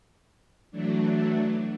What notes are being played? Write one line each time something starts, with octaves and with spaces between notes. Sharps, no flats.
E3 F#3 A3 D4